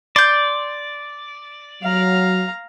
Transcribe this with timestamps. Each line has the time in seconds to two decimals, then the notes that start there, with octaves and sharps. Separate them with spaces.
0.16 D5 C6 G6
1.83 F#3 F5 A#5